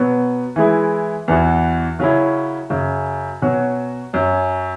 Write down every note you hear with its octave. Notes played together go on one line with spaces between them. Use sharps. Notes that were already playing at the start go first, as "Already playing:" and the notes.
Already playing: B2 F#3 B3
E3 G#3 E4
E2 E3 B3 F#4
C#3 F#3 C#4 E4
F#2 C#3 F#3
B2 F#3 C#4 F#4
F#2 F#3 C#4